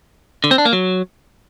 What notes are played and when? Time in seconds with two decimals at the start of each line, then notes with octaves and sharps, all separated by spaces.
0.44 D3
0.51 C4
0.58 D4
0.65 A#3
0.73 F#3